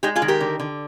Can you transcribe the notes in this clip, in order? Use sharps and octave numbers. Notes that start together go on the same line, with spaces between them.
G#3 D#4 G4
F4 G#4
D#3
G4 A#4
D3
D3